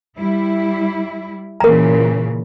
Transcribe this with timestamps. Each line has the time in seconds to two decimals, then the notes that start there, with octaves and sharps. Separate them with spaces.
0.18 G3 E4
1.60 A#2 C#3 E3 A#4 A#5